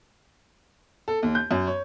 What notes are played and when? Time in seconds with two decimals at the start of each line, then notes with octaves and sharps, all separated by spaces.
1.08 A4
1.23 D#2
1.35 G6
1.51 F#2
1.67 C#5